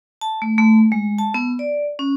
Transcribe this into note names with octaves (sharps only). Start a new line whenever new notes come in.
A5
A3
A3
G#3
A5
B3
D5
C#4